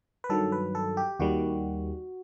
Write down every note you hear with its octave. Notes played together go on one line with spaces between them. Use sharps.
B4
G2 D#3 F#3 A4
B4
A4
G4
D#2 D#3 G3 F#4